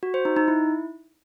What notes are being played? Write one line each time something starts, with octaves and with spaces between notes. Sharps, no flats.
F#4
C5
D#4
D#4
E4